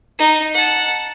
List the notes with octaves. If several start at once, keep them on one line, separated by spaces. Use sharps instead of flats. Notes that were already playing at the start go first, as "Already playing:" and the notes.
D#4
F#5 A5